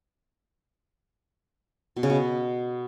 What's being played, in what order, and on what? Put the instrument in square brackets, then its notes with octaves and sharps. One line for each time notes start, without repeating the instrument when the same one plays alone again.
[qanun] B2
C#3
B2